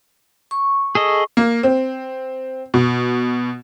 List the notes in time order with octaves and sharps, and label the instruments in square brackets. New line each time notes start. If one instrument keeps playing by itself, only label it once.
[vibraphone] C#6
[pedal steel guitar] G#4 A4 D#5
[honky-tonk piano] A#3
C4
B2